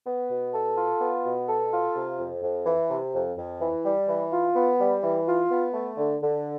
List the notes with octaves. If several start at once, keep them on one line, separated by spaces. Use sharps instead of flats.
B3
B2
A4
F4
B3
B2
A4
F4
C3
F2
F2
E3
C3
F2
F2
E3
G3
E3
F4
B3
G3
E3
F4
B3
A3
D3
D3